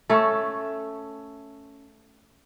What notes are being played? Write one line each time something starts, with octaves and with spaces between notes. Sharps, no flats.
A3 C#4 A4